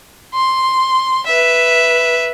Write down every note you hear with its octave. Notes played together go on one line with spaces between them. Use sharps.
C6
B4 E5